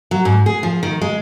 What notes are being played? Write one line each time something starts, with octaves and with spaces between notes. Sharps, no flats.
F#3
G#2
G#4
F3
D#3
G#3